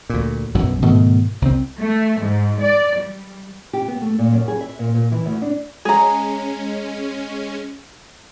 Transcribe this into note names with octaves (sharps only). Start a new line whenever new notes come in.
D2 A#2
B1 F#2 B2
G#2 B2 D#3 A3
C2 C4
A3
G#2
D5
G3
G4
B3
A3
A#2
F#2
G#4
E5
A#2
A#2
E3
D2
D4
G#3 C#4 G#4 A#5